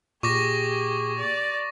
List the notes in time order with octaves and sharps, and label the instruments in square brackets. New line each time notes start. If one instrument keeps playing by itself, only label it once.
[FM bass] A#2 [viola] G4 G#4 [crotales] C#6 D6 A#6
[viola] D5